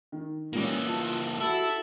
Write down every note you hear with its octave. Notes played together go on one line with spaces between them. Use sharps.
D#3
A#2 E3 G3 A#3 C#4
F4 A5
E4 F#4 G4 A4